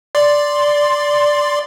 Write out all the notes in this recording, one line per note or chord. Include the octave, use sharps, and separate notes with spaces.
D5 C6